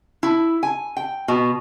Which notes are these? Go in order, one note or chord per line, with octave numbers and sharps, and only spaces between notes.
E4
G#5
G5
B2